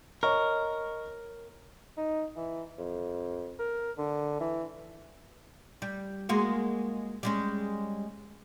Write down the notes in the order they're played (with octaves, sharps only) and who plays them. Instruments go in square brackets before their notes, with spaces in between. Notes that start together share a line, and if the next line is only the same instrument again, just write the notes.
[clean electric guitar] A#4 [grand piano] C#5 D#5 C#6
[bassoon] D#4
E3
F2
A#4
D3
E3
[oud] G3
G#3 A#3 F#4
G3 G#3 C#4